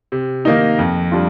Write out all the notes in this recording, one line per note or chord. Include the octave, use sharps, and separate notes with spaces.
C3
D#3 A#3 D#4
F2
G3 D4 F4